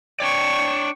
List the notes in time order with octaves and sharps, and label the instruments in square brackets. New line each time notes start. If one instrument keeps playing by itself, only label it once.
[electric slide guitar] D4 C#5 D5 [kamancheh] G5 C#6